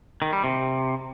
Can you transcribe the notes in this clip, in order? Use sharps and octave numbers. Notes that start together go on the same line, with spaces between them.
D#3
G3
C3